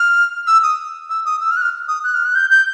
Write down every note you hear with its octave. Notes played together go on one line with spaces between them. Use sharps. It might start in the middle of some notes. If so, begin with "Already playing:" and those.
Already playing: F6
E6
D#6
E6
D#6
E6
F6
F#6
F6
D#6
F#6
F6
F#6
G6
G6